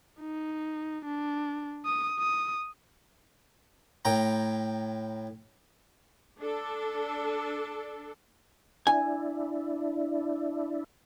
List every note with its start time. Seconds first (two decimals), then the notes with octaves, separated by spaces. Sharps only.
0.20 D#4
1.06 D4
1.86 D#6
2.20 D#6
4.05 A2 G5 A#5
6.41 D4 A4
8.87 D4 E4 G#5